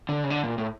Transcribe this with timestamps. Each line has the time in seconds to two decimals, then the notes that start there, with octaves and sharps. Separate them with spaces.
0.09 D3
0.24 C#3
0.30 D3
0.44 A#2
0.58 A2